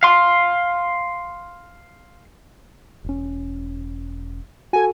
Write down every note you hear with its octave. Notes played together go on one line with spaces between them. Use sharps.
F5 C6
E1 C#4
F#4 A4 G#5